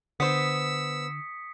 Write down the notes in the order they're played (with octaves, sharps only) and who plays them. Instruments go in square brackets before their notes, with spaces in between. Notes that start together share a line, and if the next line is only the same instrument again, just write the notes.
[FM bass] D3 [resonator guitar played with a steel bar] B3 C5 [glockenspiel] D#6 B6 C#7 [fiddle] E6